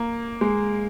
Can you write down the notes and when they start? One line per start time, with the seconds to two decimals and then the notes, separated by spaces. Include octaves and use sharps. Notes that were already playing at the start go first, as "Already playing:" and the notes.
Already playing: A#3
0.41 G#3